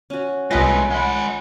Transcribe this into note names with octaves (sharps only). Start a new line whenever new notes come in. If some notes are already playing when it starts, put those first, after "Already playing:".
C#4 F#4
C2 G#3 A3 F4 B4 D#5 F5 A#6
G#3 F#5 B5